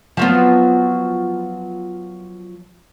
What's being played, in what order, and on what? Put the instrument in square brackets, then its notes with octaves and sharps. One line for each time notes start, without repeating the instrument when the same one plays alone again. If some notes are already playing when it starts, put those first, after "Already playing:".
[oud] F3 F#3 B3